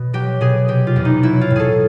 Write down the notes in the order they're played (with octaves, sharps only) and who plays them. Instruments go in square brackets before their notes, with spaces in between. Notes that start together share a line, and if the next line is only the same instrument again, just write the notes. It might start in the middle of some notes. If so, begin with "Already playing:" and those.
Already playing: [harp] B2
F#3 G4
B2 G#4
C3 G4
F4
E2
D#4
F#3 E4
F4
A2
G#4 A4